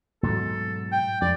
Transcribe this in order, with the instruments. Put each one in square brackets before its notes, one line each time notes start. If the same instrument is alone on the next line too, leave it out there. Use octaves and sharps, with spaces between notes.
[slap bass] G#2 B2 F#3 [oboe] A4
[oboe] G5
[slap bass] F2 [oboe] D5